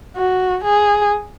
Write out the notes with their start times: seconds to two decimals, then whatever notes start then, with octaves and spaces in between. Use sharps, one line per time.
0.16 F#4
0.64 G#4